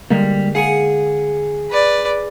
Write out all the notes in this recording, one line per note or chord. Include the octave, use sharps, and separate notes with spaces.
D3 G3 G#3 A#3
G#4 F5 F#5 G#5
B4 D5